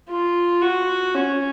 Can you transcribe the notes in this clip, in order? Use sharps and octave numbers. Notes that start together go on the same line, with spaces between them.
F4
F#4
C#4